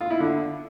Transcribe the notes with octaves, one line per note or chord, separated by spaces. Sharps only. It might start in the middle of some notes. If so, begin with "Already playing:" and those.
F4
E4
D3